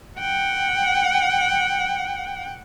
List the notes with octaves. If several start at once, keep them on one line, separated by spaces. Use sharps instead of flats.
F#5 G5